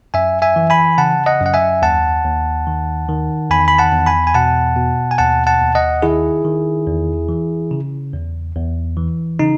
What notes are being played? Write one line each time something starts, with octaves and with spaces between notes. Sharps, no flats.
F#2 E5 G#5
E5 G#5
E3
G#5 B5
C#3 F#5 A5
D#5 F#5
F#2
F#5
E5 G#5
D#2 F#5 A5
D#2
D#3
D#3
E2 G#5 B5
B5
F#5 A5
E2
G#5 B5
G#5
B2 F#5 A5
B2
G#5
D#2 F#5 A5
F#5 A5
D#2
D#5 F#5
D#3 E4 G#4
D#3
E2
E3
C#3
E2
E2
E3
C#3 D#4